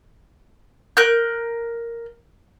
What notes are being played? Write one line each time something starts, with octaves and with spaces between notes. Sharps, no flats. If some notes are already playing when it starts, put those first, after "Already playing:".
A#4 F#6 G6